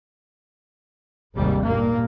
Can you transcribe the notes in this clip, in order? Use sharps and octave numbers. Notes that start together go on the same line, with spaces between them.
G#1 D#2 G#2 C3 G3
G2 A#2 A#3